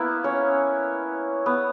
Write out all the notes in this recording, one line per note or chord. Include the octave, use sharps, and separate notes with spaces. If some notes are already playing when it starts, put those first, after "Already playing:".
Already playing: A#3 B3 E4 B4
C#4 C#5
B3 B4